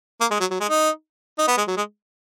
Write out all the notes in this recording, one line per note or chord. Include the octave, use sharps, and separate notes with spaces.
A#3
G#3
F#3
F#3
G#3
D#4
D#4
B3
G#3
F#3
G#3